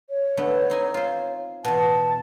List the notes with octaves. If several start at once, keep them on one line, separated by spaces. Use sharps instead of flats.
C#5
D3 A3 B3
C4 D#4 G#5
F4 C5
E2 B2 A5